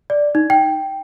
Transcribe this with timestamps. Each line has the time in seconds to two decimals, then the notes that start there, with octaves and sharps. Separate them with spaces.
0.10 D5
0.35 D#4
0.50 G5